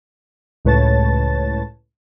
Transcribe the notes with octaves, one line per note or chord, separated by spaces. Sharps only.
C#2 A2 B4 C#5 A5 A6